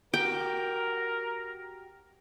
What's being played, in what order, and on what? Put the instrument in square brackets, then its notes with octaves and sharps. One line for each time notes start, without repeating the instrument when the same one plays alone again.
[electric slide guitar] F#4 G4 [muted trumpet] A#4 [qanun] G5